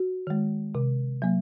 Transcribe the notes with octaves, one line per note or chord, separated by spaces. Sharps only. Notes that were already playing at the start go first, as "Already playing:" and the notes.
Already playing: F#4
D#3 G#3
C3
F#3 A#3